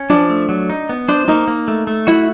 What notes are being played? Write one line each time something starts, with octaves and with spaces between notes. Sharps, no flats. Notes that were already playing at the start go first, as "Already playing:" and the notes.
Already playing: C#4
F3 D4
A3
F#3
D#4
B3
D4 C5
A#3 D#4
A#3
A3
A3
E4 F#4